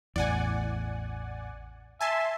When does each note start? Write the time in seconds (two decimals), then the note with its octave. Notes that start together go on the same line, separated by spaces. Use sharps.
0.16 A1 E2 D5 F#5 G#5
2.01 E5 G#5 A5 C6